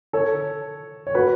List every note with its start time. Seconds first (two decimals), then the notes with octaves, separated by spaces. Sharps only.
0.13 A4 C#5
1.07 C#5
1.14 F#4 B4